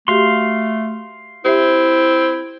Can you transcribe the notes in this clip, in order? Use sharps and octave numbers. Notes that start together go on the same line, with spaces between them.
A3 F#4 G4 F5 C6
C4 E4 G4 C5 E5